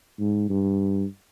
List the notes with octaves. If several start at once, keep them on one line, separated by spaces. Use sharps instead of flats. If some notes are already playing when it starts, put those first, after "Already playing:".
G#2
G2